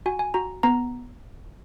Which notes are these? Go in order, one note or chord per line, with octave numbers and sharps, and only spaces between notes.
F#4 G#5
G#5
F#4 A#5
B3 A#5